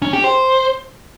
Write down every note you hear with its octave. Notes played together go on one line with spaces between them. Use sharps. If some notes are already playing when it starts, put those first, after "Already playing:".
C#4
G4
C5